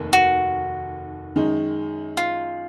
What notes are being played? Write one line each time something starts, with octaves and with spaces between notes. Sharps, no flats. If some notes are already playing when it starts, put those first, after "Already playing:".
Already playing: F1 D#2 D#3 A#3
F#4
F#2 D#3 G#3 D#4
F4